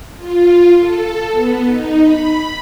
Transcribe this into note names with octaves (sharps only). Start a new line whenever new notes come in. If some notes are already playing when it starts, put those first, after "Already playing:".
F4
A4
B3
D#4
B5